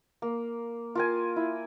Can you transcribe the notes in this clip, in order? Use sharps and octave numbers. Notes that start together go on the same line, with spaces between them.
A#3
F4 A#4 G#5
E4